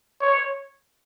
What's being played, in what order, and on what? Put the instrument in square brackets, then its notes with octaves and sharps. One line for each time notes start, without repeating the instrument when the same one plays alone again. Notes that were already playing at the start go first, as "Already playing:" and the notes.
[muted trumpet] C#5